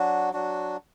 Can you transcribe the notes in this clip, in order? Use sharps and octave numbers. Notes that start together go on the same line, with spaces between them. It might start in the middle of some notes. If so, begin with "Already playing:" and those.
Already playing: F#3 D4 F#4
F#3 D4 F#4